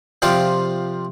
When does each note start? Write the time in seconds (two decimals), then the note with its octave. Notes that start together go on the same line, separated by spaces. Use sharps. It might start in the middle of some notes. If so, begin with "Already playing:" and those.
0.22 C3 F3 F4 D5 F5 G5